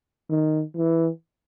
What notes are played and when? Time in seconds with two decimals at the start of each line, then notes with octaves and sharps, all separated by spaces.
0.30 D#3
0.76 E3